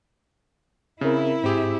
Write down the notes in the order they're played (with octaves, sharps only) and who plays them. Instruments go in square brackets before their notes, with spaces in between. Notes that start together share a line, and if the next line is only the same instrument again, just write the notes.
[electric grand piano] C#3 [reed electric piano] C4 A#4 [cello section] E4
[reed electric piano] G#2 [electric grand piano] C4 G4 G#4